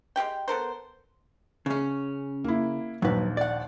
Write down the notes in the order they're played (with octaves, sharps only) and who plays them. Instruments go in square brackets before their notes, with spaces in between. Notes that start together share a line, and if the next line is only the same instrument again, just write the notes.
[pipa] G#3 C#4 G4 G5
B3 A4 A#4 C5
[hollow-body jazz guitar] C#3 C#4
[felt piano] A#3 E4
[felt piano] A#1 D#2 [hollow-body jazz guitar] F#3 B4
[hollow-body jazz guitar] D5 F#5